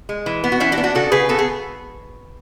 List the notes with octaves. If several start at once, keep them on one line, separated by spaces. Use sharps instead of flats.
G#3
E3
B3
F#4
E3 C#4 E4
D4 F#4
B3
D4 F#4
C#3 F#4 A4
C#3 G#4 B4
B3 F#4 A4
G#4